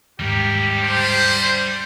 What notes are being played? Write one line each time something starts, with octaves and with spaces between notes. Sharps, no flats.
D#2 G#2 G3 G4 A#4
D4 C5